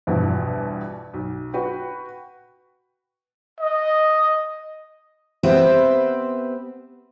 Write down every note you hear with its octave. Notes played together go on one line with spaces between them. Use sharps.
A#1 E2 G2 B2 E3
B1
F#4 B4 G5
D#5
B3 C4 G4 B4 C5 E5